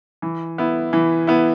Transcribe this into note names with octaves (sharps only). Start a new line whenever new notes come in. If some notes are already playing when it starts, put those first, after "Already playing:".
E3
B3 E4
E3
B3 E4